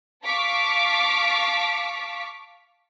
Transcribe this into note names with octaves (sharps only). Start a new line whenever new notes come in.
F5 A5 C#6 D6 B6